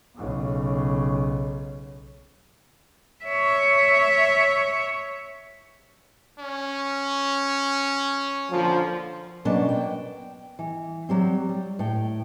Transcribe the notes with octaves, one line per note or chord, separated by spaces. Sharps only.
B1 C#3
C#5 E5
C#4
A#2 D3 F3
B2 F#3 A#3 C#4 D4
G5
E3
F#3 G3 C4
G3
A2 G5